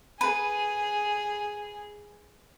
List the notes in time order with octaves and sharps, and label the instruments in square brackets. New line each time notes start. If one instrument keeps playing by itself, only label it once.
[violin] G#4 [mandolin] B4